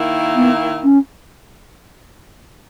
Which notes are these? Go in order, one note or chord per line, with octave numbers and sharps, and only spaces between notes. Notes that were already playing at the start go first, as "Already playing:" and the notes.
Already playing: D#3 A#3 E4
B3
C#4